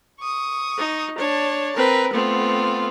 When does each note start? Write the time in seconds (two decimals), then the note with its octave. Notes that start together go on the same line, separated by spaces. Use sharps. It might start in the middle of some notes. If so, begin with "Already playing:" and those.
0.20 C#6 D#6
0.78 D#4
1.18 D4 C#5 A5
1.76 C4 A#4 B4
2.13 A3 B3 C4 F4